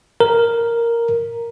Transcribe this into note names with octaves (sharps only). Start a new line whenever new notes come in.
A#4